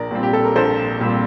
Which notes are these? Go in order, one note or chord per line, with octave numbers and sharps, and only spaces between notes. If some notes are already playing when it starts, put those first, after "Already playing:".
Already playing: A#1 A#4 D5
A#2 G3 C4
G4
A4
A#4
A#1 A4 C5
A#2 G3 C4